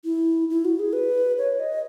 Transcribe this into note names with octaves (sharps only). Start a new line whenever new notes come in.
E4
E4
F#4
G#4
B4
C#5
D#5